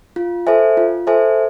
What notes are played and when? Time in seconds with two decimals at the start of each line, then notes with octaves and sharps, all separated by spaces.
0.16 F4
0.47 A4 C5 E5 G#5
0.77 F4
1.07 A4 C5 E5 G#5